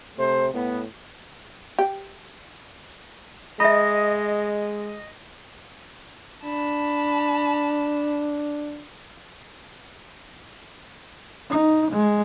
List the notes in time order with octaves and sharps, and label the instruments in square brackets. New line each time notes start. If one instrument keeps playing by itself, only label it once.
[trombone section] C3 A3 C5
A2 B3
[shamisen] G4
[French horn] G#3 [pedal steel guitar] D#5 [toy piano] E5 B5
[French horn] D4 [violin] A5 B5
[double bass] D#4
G#3